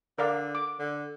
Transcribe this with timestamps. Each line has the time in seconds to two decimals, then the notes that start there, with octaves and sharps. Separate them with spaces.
0.18 D3 A#4 D5 F5
0.55 D6
0.79 D3